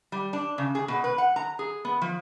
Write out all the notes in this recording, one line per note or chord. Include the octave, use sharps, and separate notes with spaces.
G3
D4
C#3
G#4
B2
B4
F#5
A#5
G#4
B3
F3